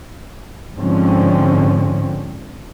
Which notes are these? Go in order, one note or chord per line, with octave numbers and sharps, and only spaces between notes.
G#2 D3 F3 C4 C#4